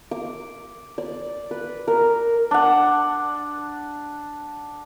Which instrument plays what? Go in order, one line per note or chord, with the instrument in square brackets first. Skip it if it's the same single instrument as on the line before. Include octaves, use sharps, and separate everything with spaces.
[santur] D6
D5
B4
A#4
D4 F#5